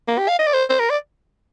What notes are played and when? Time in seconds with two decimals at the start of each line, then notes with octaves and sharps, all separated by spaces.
0.08 A#3
0.18 G4
0.28 F5
0.39 D#5
0.47 D5
0.53 C5
0.70 C5
0.80 A#4
0.90 D5